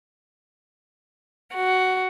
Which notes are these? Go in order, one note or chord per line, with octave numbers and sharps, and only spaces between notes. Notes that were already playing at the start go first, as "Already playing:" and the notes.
F#4